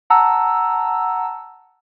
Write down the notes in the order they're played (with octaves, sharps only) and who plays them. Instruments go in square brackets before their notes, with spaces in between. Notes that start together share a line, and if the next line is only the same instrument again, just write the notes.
[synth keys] F#5 A5 A#5 E6